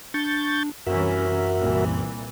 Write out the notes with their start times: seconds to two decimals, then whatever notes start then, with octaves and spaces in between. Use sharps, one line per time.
0.14 D4 C#6 G6 A6
0.87 C2 F#2 E3 C#4 F#4 A#4 E5
1.56 C2 A#2 E3